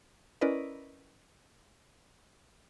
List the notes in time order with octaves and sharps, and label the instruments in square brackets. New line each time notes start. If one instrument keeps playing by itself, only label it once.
[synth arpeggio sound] C#4 E4 A#4 B4 D5 D#5